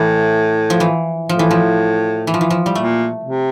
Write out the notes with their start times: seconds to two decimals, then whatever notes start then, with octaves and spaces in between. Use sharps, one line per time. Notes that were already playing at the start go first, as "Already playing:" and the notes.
Already playing: A2 E3
0.70 F3
0.80 E3
1.29 A2 F3
1.39 E3
1.51 F3
2.27 E3
2.34 F3
2.41 E3
2.50 F3
2.66 G3
2.75 A#2 A3
3.24 C3